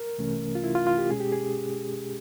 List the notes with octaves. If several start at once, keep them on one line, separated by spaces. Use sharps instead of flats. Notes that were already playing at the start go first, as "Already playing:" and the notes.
Already playing: A#4
C2 C3 E3 A3 C#4
F4
E4
F4
F4
G4
B2 G#3 C#4 G#4
G4
G#4